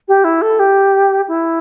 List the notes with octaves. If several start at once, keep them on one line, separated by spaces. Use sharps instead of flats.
G4
E4
A4
G4
E4